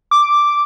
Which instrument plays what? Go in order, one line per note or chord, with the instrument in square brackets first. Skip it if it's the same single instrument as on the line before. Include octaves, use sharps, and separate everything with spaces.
[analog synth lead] D6